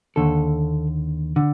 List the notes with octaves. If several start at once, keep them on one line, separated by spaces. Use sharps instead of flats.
D#2 D3 A4
D3